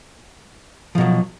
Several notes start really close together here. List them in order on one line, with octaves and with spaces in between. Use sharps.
F3 B2 F#3